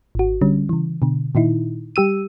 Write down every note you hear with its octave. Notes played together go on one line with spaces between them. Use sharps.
G#1 F#4
D3 G3 C#4
C#3 E3
B2 D3
A#2 D#3 D#4 E4
G3 G4 E6 D#7